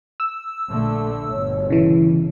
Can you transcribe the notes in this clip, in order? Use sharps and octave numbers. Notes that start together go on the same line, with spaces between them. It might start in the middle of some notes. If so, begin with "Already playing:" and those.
E6
A#1 D3 A3
G1 B2 C#5
C#3 E3 E4